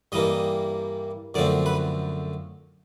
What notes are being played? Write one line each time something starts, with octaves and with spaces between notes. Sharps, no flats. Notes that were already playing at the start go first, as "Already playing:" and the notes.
G2 E3 G3 A#3 D#5
F#2 D3 F3 A3 C4 D5
B4